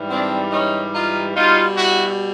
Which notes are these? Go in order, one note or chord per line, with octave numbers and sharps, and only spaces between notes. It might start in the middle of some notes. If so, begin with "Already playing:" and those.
Already playing: G#2 E3 G3
C4 D4
C#4 D#4
D#4 F4
B2 G3 D#4 F4
E4 F#4